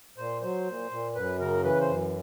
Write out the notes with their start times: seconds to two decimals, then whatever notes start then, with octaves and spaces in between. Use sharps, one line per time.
0.18 A#2 C5
0.42 F#3 C5
0.66 A#2
0.91 A#2
1.15 F#2 B4
1.39 C#3 A#4
1.64 E3 B4
1.81 C5
1.88 F#2